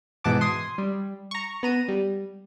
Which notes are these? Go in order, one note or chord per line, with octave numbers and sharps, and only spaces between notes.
G#2 B2 E3 F#5 A5 D6
C6 D#6 G#6 C7
G3
A#5 C#6
B3 A#5 D#7
G3